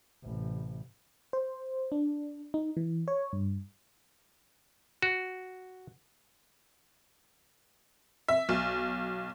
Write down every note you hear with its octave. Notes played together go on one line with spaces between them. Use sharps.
A1 C3
C5
D4
D#4
E3
C#5
G2
F#4
E5
B1